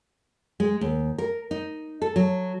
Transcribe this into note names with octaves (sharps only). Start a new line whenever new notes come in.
G#3
D#2
A#4
D#4
A4
F#3